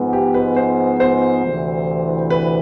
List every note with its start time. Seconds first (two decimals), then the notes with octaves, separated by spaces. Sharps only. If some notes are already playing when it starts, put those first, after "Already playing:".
Already playing: G#2 F3 G#3 B3
0.13 G4
0.34 B4
0.56 C5
1.00 C5
1.44 D2 C3 E3
2.30 B4